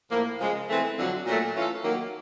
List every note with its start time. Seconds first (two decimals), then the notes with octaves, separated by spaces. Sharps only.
0.10 A2 F3 A#3
0.40 C#3 F3 G#3
0.69 E3 A3 C4
0.96 F2 D3 F#3
1.25 A#2 F#3 A3
1.54 E3 A3 C#4 F4 A4
1.83 D#3 F#3 A#3